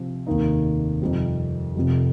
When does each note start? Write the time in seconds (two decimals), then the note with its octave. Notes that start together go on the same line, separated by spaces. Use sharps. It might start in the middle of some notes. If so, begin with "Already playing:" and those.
Already playing: C3 F3 C4
0.27 F1 D#2 D#3 A#3 D#4
1.01 F2 C3 G3 C4
1.76 F1 F2 C3